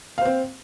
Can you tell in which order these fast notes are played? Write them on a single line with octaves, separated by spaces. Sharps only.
F5 C5 C4